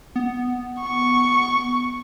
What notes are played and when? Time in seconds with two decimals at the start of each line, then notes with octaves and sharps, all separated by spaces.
0.16 B3
0.81 C#6